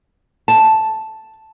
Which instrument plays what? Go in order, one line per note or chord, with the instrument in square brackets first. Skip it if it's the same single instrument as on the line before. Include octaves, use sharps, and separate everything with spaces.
[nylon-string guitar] A5